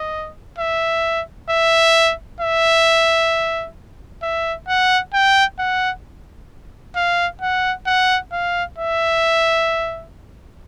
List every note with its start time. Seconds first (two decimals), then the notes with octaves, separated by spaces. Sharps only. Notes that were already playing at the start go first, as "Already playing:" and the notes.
Already playing: D#5
0.59 E5
1.50 E5
2.41 E5
4.23 E5
4.68 F#5
5.14 G5
5.59 F#5
6.96 F5
7.42 F#5
7.87 F#5
8.32 F5
8.78 E5